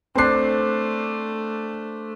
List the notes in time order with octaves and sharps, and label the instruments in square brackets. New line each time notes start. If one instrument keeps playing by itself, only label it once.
[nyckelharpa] A3 [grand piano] C4 C7 [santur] D4 C5